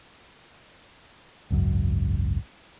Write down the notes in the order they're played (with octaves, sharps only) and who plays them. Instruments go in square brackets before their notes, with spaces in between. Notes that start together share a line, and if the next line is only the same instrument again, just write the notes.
[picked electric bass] G#1 C#2 F#2